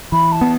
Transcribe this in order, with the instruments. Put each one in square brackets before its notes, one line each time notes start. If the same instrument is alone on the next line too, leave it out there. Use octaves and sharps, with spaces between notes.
[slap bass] E3 [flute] B5
[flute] A5
[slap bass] B3